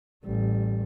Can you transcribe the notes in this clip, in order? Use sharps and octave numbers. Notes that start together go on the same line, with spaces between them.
A1 G3